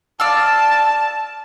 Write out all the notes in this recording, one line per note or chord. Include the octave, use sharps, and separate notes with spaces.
D5 F5 A5 E6